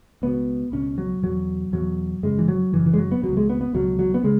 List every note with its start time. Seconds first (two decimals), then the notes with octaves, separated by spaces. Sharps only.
0.22 C#2 B2 B3
0.72 C#2 B2 C#4
0.98 F#3
1.23 E2 B2 F#3
1.72 E2 B2 F#3
2.23 F#2 C#3 G#3
2.39 E3
2.48 F#3
2.73 F#2 C#3 E3
2.86 E3
2.94 G#3
2.98 F#3
3.11 B3
3.23 B2 F#3
3.29 C#2
3.37 G#3
3.49 B3
3.61 B3
3.74 C#2 B2 F#3
3.99 F#3
4.14 B3
4.24 C#3 G#3